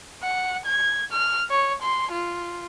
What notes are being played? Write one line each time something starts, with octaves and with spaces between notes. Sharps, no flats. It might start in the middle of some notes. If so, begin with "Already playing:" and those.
F#5
G#6
F6
C#5
C6
F4